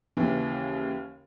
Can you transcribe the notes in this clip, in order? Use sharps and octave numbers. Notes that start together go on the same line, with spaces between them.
D#2 C#3 E3